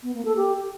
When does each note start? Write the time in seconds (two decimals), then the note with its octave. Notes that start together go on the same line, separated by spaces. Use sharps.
0.03 B3
0.14 A#3
0.25 A4
0.36 G4